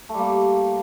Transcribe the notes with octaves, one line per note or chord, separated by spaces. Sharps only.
G3 A3 A#3